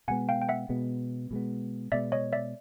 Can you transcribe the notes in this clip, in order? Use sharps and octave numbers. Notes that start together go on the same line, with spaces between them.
B2 G#3 B3 F#5 G#5
F5 G5
G5
E5 F#5
B2 G#3 B3
B2 G#3 B3
B2 G#3 B3 D5 E5
C#5 D#5
D5 E5